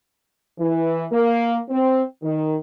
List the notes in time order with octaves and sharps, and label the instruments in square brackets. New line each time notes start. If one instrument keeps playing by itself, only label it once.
[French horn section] E3
A#3
C4
D#3